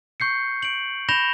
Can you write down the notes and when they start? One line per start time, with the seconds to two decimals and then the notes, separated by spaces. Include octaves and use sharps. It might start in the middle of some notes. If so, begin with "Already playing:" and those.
0.20 C#6 G6 C7 C#7
0.62 D7 F#7
1.09 B5 G6 A#6 E7 F7 G7